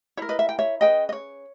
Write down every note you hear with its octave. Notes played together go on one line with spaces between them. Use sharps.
E4 A#4 C#5
B4 D#5
E5
G5
C#5 E5
C#4 G#4 B4 D#5 G5
D#5
C#5